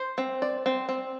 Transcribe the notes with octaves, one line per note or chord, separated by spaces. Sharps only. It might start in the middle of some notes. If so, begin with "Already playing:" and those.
Already playing: C5
C4
D5
C4
C4